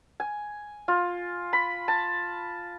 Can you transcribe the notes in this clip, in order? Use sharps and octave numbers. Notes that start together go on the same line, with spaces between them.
G#5
F4
B5
A5